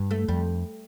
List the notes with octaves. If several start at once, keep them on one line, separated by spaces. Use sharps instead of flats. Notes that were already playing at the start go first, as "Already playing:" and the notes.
Already playing: G2
A3
F2 G3